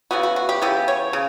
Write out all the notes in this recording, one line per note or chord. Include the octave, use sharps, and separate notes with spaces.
C#3 E3 B3 F#4
F#4
F#4
G4
C#3 E3 B3 G4
C#5
C#3